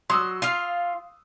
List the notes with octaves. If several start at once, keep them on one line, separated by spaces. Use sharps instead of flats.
F#3 C6 D#6 E6
F4 F5